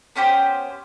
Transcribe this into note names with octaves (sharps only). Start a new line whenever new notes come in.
B3 C#4 G4 C5